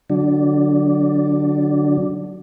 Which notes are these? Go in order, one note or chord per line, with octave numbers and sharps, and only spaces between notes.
D3 F#3 D4